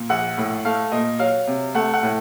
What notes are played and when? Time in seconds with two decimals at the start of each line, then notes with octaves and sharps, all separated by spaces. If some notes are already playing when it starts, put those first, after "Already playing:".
Already playing: A#2
0.09 A#1 F#5
0.38 A2
0.65 A3 F5
0.92 A#2 D#5
1.19 F#3 F5
1.47 C3
1.74 A3 F#5
1.93 F#5
2.03 A2